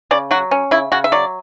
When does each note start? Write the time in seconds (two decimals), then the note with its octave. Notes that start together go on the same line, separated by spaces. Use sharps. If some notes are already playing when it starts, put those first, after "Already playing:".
0.11 C#3 D5
0.31 F#3 F#4
0.51 C#4
0.71 C#3 E4
0.92 C#3 F#4
1.04 E5
1.12 F#3 D5